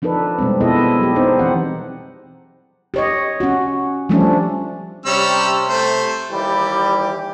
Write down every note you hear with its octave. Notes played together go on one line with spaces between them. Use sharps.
F3 D4 D#4 A4 B4
B2 G3 G#3 C4
B2 B3 E4 G#4 A4 D#5
F#3 G4
C4 D4 D#4 C5
E3 C4 F#5
G4 C#5 D#5
C#4 F#4
F3 G3 A3 C#4 D4
C3 G3 C#4 E6
A3 C5
D#2 E3 G3 G4